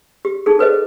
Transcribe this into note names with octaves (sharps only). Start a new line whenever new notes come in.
G4
D#4 G#4 A4
A4 B4 C5 D#5